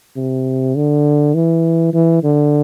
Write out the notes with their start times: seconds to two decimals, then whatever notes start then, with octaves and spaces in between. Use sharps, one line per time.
0.17 C3
0.76 D3
1.35 E3
1.93 E3
2.24 D3